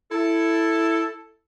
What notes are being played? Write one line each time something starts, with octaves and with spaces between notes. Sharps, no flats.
E4 A4